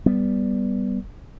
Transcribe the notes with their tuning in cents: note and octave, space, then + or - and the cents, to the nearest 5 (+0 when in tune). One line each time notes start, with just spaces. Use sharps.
G3 +0 B3 +0